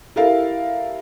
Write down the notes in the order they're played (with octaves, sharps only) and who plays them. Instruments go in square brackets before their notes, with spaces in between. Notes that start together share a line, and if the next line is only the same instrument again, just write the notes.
[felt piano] E4 G4 A4 A#4 E5 F5